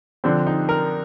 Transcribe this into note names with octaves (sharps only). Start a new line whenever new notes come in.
D3 F3 C4 D4
D#4
A#4